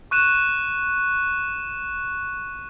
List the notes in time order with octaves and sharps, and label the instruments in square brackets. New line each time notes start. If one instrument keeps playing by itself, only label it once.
[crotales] C#6 F#6 D#7 E7